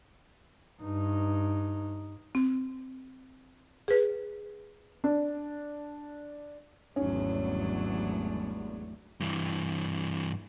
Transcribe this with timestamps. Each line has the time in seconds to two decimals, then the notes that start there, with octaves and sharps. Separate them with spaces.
0.82 G2 D#4
2.35 C4
3.88 G#4 B4
5.04 D4
6.96 G#1 E2 F#3 G3 A3 C#4 D4
9.20 G2 E3